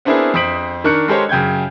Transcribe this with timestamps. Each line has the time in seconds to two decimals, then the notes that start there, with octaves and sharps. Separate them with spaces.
0.05 B3 C4 D4 E4 G#4 A#4
0.34 F2 C5 D#6 B6 D7 F#7
0.84 D#3 D4 A#4 C#6 F#6 C#7
1.08 G#3 G4 A4 A#4 C5 C#5
1.29 F#2 C#3 G5 G6 G#6